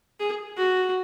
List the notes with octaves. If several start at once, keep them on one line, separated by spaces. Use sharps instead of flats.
G#4
F#4